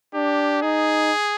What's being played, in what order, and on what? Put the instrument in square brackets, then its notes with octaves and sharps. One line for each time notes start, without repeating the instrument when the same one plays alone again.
[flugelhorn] D4 [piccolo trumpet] G4
[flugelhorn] D#4 [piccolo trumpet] G#4